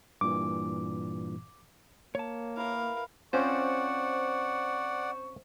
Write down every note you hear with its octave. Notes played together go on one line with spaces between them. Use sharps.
G2 A#2 E3 D6
A#3 C#5 A5
E4 A#4 B4 F5 D6
C4 C#4 F4 C5 D5 F#5 C#6